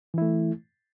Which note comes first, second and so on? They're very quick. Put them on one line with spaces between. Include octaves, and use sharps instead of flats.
E3 E4 A3